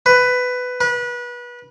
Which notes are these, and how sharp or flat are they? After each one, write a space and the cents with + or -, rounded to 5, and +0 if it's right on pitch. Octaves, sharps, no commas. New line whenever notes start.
B4 +15
B4 -25